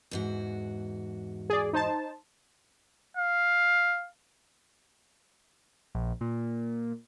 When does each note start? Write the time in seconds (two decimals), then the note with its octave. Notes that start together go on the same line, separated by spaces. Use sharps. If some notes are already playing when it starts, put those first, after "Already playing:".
0.11 E2 G#2 F#4
1.50 G#4 D5
1.73 D#4 C5 A5
3.17 F5
5.95 A#1
6.21 A#2